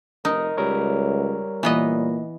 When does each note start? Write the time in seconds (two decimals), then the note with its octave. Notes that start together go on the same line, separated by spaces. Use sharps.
0.25 F1 D#4 A#4 D#5
0.57 C#2 G3 A#4 C#5
1.63 A#2 E3 B3 D#5